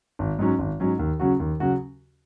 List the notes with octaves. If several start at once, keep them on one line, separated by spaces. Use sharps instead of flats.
G#1
G#2 F#3 C#4
G#1
G#2 F#3 C#4
D#2
C#3 F#3 C#4 F#4
D#2
C#3 F#3 C#4 F#4